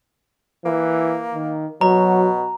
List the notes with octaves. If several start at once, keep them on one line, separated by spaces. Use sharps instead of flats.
E3 A#3
D#3
B2 F#3 F#4 A#5